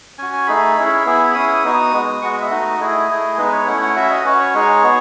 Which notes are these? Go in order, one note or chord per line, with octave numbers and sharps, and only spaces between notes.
C#4 F#4 G#5
G#5
A3 D#4 G#4 B5
C#4 E4 G#4
B3 E4 G#4
C#4 E4 G#4 D#6
D#6
B3 D#4 F#4
G#3 B3 F#4
G#3 B3 F#4 C#6
D#5
E5
A3 D#4 F#4 D#5
A3 E4 G#4
A3 E4 G#4
G#3 B3 D#4 B4
C#5
A3 C#4 E4 F#5
F#5
C#4 F#4 E5
D#5
C#4 F#4 B4
C#5
G#3 D#4 G#4 C#5
B3 F#4